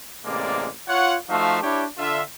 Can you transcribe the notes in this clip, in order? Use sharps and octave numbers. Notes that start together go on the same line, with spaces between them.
A1 C3 G#3 A#3 D5
F4 C#5 F#5
F3 A3 D#4 F#4 E5 F5
D4 E4 G4 C#5
D3 F4 E5